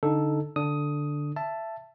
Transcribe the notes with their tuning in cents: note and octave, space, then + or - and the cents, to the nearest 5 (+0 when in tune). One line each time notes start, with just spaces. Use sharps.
D3 -10 D#4 +0 A4 +0
D3 +0 D4 +0 D#6 +10
E5 +15 A5 +0